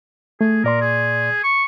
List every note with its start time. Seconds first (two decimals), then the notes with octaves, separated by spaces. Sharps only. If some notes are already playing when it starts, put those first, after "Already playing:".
0.41 A3 G#4
0.64 A#2 A#4 D5 C6
0.81 G#4
1.44 C#6